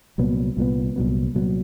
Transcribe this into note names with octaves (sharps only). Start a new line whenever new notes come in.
C2 A#2 F#3 B3
C2 A#2 F#3 B3
C2 A#2 F#3 B3
C2 A#2 F#3 B3